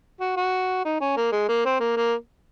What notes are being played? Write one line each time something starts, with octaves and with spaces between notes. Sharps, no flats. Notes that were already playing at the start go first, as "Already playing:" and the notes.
F#4
F#4
D#4
C#4
A#3
G#3
A#3
C4
A#3
A#3